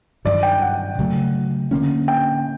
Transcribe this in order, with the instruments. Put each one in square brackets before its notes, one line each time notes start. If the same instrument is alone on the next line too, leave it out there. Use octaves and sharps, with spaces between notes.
[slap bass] G2 D#3 F#3 [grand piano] D5
[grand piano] G5
F#5
[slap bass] C#3 F#3 A3
D3 F3 A#3 C#4
[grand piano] G5